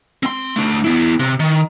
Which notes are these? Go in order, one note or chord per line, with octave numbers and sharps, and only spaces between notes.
C4 C6
A3 D4
B3 E4
C3
D#3